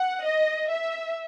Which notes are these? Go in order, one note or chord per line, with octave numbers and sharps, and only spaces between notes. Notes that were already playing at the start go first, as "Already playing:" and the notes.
Already playing: F#5
D#5
E5